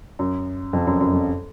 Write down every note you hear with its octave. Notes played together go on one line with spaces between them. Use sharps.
F#2
F2
F#2
F#2
F2